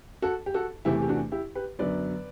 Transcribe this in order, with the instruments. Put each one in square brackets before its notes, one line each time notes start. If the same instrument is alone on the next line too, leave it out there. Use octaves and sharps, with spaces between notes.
[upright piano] F#4 A4
G4
F#4 A4
E2 C3 E3 A3 E4 G4
G4
D4 F#4
E4 G4
G4 B4
F#2 D3 F#3 B3 B4 D5